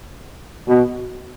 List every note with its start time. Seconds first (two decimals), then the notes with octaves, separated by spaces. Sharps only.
0.68 B2